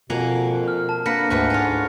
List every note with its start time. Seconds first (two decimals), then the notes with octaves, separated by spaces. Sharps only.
0.10 F2 B2 A#3 F#5 G#5
0.68 F6
0.89 A5
1.06 D3 A#3 B4 F6 A#6 C#7
1.30 D2 G#2 F#4 B4
1.50 G#2 C#4 F4